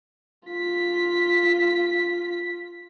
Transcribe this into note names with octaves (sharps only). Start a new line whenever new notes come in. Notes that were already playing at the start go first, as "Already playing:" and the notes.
F4 B6